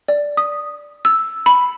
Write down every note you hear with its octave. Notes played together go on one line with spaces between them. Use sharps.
D5
D#6
E6
B5